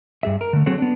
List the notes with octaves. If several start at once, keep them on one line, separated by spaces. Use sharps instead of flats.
G2 G#4 E5
A#4
D3 A3
F#3 C4 F#4 G#4 A4 C#5
B3 D4